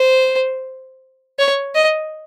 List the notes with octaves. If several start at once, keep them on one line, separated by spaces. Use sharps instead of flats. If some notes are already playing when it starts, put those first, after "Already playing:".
Already playing: C5
C#5
D#5